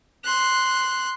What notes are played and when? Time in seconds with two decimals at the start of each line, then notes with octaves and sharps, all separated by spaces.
0.24 C6 F#6